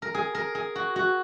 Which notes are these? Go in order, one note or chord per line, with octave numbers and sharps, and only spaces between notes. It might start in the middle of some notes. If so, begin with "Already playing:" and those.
A#4
G#4
A#4
G#4
F#4
F#4